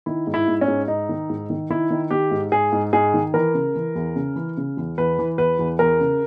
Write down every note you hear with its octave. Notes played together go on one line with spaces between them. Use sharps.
D#3 E4
G#2
E4
G#2
C#4
G#2
G#2 D#4
D#3
G#2
D#3
D#3 E4
D#3
D#3 G4
G#2
G#2 G#4
G#2
G#2 G#4
D#3
E3 A#4
C#3
E3
E2
C#3
E3
C#3
E2
E2 B4
E3
E2 B4
E2
E2 A#4
C#3